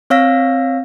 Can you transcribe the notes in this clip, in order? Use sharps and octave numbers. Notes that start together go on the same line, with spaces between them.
C4 C#5 F5 E6 A#6